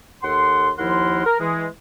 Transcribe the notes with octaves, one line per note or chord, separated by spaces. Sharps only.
D#2 A4 F#5 C6
D#2 F3 E4 A#4 F#5 C6
A#4
E3 G#3